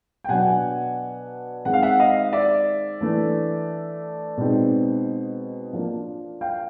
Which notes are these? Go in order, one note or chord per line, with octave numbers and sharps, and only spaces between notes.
G5
B2 F#3 B3 D4 F#5 G#5
D#3 G#3 C4 F#5
F5
E5 F#5
D#5 F5
D5 E5
E3 A3 D4
B2 G#3 C4 D#4
F3 A#3 D4
F5 G5